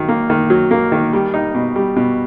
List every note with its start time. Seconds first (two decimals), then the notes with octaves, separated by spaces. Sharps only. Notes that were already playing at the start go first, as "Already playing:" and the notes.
Already playing: D#3 F#3
0.08 A#3
0.30 D#3
0.50 F#3
0.71 A#3
0.92 D#3
1.13 G3
1.34 D#4
1.55 B2
1.76 G3
1.96 B2